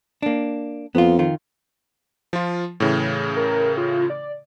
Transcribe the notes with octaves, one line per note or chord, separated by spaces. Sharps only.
A#3 D4
F2 B3 F4
D#3 F4
F3 F4
A2 C#3 E3
A#4
F4
D5